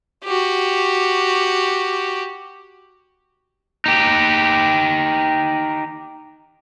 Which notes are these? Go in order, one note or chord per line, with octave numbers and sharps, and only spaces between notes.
F#4 G4
D#4 G4